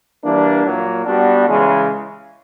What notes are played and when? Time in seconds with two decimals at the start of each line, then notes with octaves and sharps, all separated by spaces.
0.24 E3 G3 A#3 D4
0.64 A#2 F#3 A#3
1.06 G3 B3 D4 F#4
1.47 C#3 E3 G#3